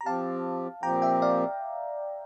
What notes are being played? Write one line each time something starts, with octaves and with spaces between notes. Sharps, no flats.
A#5
F3 C4 G4 F5 A5
A#2 F3 C4 G4 G5 A#5
E5 G5
D5 F5